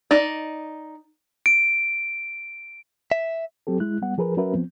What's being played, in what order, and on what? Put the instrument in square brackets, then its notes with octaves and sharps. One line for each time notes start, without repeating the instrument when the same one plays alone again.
[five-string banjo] D#4 D5
[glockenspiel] D7
[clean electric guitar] E5
[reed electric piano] F#3 C4 G4 A4
G#3 E4 F#6
G3 B3 F#5
F3 G#4 A#4 B4
F#3 C#4 F#4 A#4 B4 E5
F3 B3 C4